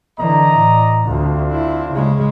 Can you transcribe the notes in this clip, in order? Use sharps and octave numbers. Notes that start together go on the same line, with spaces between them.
D3 E3 D5 D#5 A#5
A2
D2 C4 D4 F4
E4
C#3 G#3